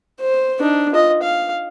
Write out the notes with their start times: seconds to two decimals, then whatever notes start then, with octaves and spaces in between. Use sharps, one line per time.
0.20 C5
0.60 D4 D#4
0.92 F4 D#5
1.22 F5